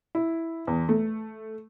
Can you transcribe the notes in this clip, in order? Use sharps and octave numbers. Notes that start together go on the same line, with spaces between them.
E4
E2
A3